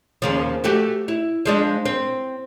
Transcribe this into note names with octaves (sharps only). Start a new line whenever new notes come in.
D#2 C#3 F3
A3 F#4 G4
E4
F3 G#3 D4
C4